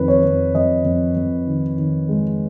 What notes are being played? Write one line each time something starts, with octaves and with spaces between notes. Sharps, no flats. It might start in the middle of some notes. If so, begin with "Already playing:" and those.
Already playing: F2 D#3 B4
C#5
F2
F2 D#5
F2
F2
D#3
D#3
G#3